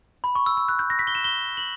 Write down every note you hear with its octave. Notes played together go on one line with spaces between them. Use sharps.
B5
C#6
E6
E6
F#6
G6
A#6
B6
G7
E7
G7
F#7